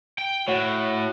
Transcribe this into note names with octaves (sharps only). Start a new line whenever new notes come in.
G5
A2 F#4 C#5 F#5